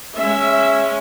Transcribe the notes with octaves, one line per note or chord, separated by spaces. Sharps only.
G#3 C#4 E5